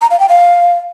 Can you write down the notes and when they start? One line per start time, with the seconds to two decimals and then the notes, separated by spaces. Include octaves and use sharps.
0.01 A#5
0.11 F5
0.20 G5
0.29 F5